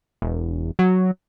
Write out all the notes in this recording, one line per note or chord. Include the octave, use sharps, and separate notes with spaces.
E1
F#3